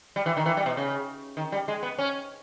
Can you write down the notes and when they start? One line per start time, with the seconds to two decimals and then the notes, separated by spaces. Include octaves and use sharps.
0.16 G3
0.26 E3
0.37 D#3
0.46 E3
0.57 G3
0.66 B2
0.77 C#3
1.37 D#3
1.52 G3
1.68 G#3
1.83 B3
1.98 C#4